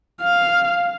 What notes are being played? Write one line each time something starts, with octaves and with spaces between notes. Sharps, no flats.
F5